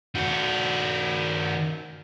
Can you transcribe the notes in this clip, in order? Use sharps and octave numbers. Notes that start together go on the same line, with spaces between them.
D#3 F#4